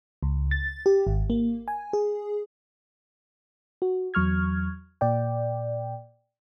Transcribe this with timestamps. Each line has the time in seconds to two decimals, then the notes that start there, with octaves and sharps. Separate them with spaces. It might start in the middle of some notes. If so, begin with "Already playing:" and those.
0.23 C#2
0.51 A6
0.86 G4
1.07 G#1
1.30 A#3
1.68 G#5
1.93 G#4
3.82 F#4
4.14 E2 F#3 C#6 F6 G#6
5.01 A#2 D5 G5